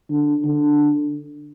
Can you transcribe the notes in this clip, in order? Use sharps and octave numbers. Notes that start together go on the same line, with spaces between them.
D3
D3